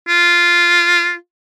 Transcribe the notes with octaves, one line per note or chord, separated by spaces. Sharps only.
F4